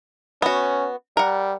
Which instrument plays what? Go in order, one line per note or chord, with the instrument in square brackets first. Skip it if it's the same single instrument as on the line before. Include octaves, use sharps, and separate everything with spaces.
[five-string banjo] B3 F#4 [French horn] C#4
[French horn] G3 [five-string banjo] A#4 F#5